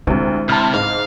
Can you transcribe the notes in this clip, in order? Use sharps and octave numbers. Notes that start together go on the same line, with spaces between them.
D2 C3 G#3 E4
C3 A5 B5 F6
G#2 F5